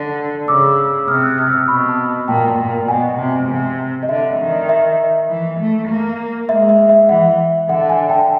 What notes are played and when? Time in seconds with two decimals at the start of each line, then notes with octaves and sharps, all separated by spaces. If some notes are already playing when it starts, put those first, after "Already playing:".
Already playing: D3
0.48 C#3 D6 E6
1.08 C3 D#6 F6
1.23 E6 F#6
1.38 D#6 F6
1.47 E6
1.53 D#6 F6
1.68 B2 B5 C#6
1.88 A5 B5
2.28 A#2 G5 A5
2.58 A#2
2.88 B2 F#5 G#5
3.18 C3
3.48 C3
4.03 D#5
4.09 D3 E5
4.39 D#3
4.69 E5
5.30 E3
5.60 A3
5.89 A#3
6.49 G#3 E5
6.69 E5
6.89 E5
7.09 E3 E5 F#5
7.69 D3 E5 F#5
7.89 F#5 G#5
8.09 G5 A5